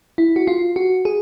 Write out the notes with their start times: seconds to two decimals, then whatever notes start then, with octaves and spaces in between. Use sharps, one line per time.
0.18 E4
0.36 F#4
0.47 F4
0.76 F#4
1.05 G#4